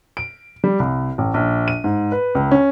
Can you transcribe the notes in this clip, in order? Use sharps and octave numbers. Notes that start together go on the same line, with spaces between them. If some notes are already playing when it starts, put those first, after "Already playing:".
D7
G3
C2
A1
A#1
D#7
G#2
B4
C#2
C#4